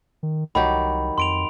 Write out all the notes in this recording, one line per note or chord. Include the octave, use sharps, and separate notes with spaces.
D#3
C2 D#3 F#3 G4 B5
F2 C6 D7 F7